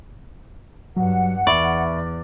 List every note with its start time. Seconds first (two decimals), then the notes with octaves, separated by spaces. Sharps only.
0.97 G2 F#3 F#5
1.47 E2 D5 E5 B5 C#6